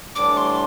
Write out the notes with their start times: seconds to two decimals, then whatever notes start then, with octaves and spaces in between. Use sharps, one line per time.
0.15 A2 E3 G3 D4 D6
0.37 C6